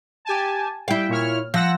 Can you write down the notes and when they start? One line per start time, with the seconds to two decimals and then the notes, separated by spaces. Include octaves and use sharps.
0.25 G4 G#5 A5
0.88 G3 E4 F5 G5
1.09 A#2 C#5 F6
1.54 F3 F#5 E6 A#6